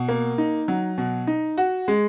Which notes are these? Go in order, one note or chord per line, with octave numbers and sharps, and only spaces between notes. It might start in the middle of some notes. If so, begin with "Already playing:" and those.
Already playing: B2
A#3
D#4
F#3
B2
D#4
F#4
G#3